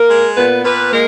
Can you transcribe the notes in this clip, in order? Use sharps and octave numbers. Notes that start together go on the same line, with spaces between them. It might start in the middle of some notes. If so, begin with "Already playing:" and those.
Already playing: A#3 A#4
G#3
A#2 B3 B4
A#2 B3 B4
G#3 A#3 A#4